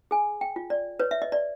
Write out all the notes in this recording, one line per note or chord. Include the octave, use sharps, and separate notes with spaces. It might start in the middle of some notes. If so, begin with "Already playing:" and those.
G#4 G#5
G5
F4
D5
B4 C#5
E5
D#5
D5